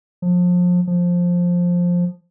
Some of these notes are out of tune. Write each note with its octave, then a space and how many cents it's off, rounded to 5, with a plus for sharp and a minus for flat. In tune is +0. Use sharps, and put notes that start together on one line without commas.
F3 +30
F3 +10